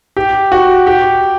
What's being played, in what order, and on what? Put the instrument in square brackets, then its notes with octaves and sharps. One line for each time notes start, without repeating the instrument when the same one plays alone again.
[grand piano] G4
F#4
G4